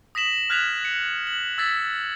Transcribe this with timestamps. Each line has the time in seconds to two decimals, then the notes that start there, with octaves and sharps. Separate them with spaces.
0.15 D#6 A#6 B6 E7 F#7
0.50 F6 F#6 G#6 B6 F7
0.85 C#7
1.27 F#7
1.58 E6 G#6 A6 B6